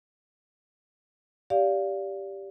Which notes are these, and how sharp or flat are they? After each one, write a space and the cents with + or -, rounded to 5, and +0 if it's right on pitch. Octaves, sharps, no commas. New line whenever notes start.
G4 +0 D5 -25 F5 +0